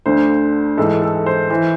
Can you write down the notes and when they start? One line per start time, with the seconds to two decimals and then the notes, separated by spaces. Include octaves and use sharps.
0.06 D2 D3 C5
0.77 G#2 E3 A4
1.02 A4
1.26 C5
1.50 E3 C5